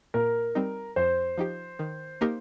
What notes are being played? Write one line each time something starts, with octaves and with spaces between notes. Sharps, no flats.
A#2 A#4
G3 C4 D#4
F2 C5
F3 D#4 G4
D#3
A#3 D#4 G4 A#4